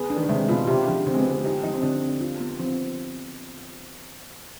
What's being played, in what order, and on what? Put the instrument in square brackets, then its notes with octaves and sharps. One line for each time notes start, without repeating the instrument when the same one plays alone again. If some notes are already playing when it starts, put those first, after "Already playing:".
Already playing: [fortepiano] B3 [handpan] G#4
[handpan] D4
[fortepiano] D#3
[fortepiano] C3 [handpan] G#3
[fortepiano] B2 [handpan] F4
[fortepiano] C3 [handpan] G4
[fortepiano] D3 [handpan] F3
[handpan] D3 [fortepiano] C4
[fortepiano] G#3
B3
[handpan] C4
[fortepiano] B3
[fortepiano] D#4 [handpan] G4
[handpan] F3 [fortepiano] D#4
[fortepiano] C4
[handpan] D3 [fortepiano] D4
[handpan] C4
F4
B3
[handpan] F3 [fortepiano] C4